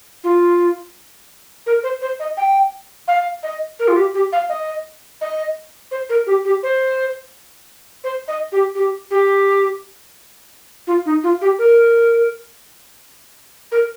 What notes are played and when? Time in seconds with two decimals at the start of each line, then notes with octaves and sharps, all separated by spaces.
0.24 F4
1.66 A#4
1.83 C5
2.01 C5
2.19 D#5
2.37 G5
3.08 F5
3.43 D#5
3.79 A#4
3.88 F4
3.96 G4
4.14 G4
4.32 F5
4.49 D#5
5.21 D#5
5.91 C5
6.09 A#4
6.26 G4
6.45 G4
6.63 C5
8.04 C5
8.28 D#5
8.52 G4
8.75 G4
9.11 G4
10.87 F4
11.06 D#4
11.23 F4
11.41 G4
11.59 A#4
13.72 A#4